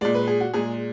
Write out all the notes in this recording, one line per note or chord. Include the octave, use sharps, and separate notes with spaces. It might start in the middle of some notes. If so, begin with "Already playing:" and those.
A#2 G#3 D5
B4
G#4
F#4
A#2 G#3 G#4